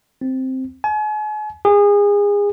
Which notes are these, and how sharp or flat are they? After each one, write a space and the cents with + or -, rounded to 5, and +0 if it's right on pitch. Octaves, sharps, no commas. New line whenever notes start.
C4 +0
G#5 +40
G#4 -30